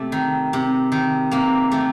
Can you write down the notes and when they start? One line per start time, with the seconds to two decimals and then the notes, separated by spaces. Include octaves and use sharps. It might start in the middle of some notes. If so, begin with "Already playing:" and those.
Already playing: C3 A3
0.12 D#3
0.53 C3
0.92 D#3
1.31 C3 A#3
1.71 D#3 A3